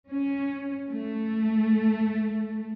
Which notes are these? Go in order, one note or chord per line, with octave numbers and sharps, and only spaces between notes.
C#4
A3